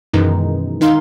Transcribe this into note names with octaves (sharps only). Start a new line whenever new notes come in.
F#2 B2 D#3 E3 G#3 D#4
D#3 D#4 F5 C6